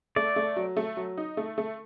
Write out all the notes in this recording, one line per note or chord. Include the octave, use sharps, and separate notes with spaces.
A3 D5
A3
F#3
A3
F#3
D#4
A3
A3